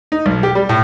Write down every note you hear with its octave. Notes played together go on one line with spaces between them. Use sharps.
D#4
B1
G4
G3
A2